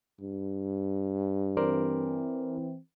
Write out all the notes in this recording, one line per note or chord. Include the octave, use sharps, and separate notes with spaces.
G2
E3 C4 A#4 C5 D5